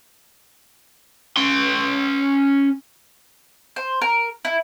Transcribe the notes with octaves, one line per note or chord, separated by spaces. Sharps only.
C#4 C6
C5
A#4
E4